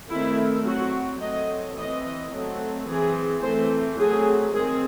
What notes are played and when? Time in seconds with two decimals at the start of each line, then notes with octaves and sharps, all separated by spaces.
0.10 D#3 A3 C4 E4
0.66 F#3 C4 F#4
1.21 F#3 A3 C4 D#5
1.77 E3 C4 D#5
2.32 F#3 A3 C4
2.87 E3 C4 G#4
3.43 E3 A3 C4 C5
3.98 F#3 A3 C4 G#4
4.53 D#3 G#3 C4 G#4